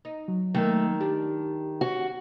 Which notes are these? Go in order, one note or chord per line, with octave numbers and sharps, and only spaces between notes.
D#4
F#3
D#3 A3 A#3
D4 G4
C#4 F#4